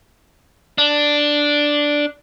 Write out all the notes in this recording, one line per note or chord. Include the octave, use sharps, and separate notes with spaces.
D4